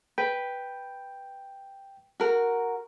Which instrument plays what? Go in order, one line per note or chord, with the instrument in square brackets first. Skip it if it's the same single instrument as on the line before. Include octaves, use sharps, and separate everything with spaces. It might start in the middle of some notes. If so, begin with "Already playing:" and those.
[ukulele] B4 [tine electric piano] G5
[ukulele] F#4 A#4